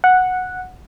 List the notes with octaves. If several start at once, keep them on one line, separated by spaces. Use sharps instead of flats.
F#5